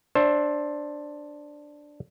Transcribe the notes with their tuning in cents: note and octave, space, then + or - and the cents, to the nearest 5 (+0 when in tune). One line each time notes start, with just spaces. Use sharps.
D4 +0 C5 +20 E5 +0